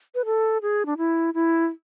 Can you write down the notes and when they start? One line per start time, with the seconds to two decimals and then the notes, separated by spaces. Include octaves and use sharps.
0.15 B4
0.25 A4
0.62 G#4
0.86 D4
0.98 E4
1.34 E4